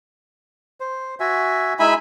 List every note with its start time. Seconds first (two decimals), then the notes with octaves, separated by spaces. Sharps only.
0.80 C5
1.20 F#4 E5 G#5
1.79 G#3 D#4 E4 E5 G#5 B5